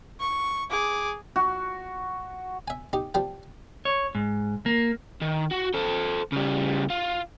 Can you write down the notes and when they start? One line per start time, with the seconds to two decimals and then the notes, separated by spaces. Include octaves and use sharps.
0.20 C#6
0.70 G#4 D6
1.36 F#4
2.68 E5 G#5
2.93 D#4 G4
3.14 F3 G3 G5
3.85 C#5
4.15 G#2
4.66 A#3
5.22 D#3
5.52 F#4
5.75 A4 C5
6.32 C#3 G3
6.90 F4